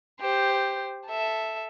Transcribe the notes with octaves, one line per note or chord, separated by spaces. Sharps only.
G4 C5
A4 E5